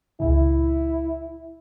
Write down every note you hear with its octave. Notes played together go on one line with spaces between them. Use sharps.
C#2 A#2 C#3 E4